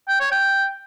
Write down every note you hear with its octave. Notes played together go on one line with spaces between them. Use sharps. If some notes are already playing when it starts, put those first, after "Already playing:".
G5
C#5
G5